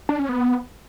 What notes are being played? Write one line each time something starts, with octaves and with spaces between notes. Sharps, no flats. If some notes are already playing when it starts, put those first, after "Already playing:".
D4
C#4
B3